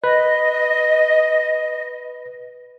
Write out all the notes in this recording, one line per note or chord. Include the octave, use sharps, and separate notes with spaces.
B4 D#5